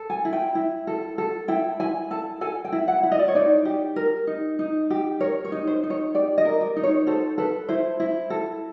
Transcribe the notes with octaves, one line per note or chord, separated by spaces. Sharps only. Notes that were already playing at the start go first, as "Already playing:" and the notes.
Already playing: A4
G#5
E4
G5
E4
A4
A4
E4 G5
E4 G#5
A4 A5
A4 G#5
G5
E4
F#5
E4
D#5
D5
C#5
D#4 D5
G4
A#4
D#4
D#4
G4
A#4 C#5
C#5
D#4
C5
D#4
C#5
G4 D5
D#5
A#4
D5
D#4
C#5
A4 C5
A4 B4
E4 C5
E4
A4